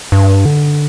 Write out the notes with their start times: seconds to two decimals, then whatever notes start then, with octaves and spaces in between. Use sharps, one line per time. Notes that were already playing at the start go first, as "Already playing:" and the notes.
0.12 G2
0.45 D3